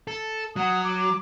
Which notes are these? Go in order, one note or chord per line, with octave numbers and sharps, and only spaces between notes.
A4
F#3 F#5 D#6
D6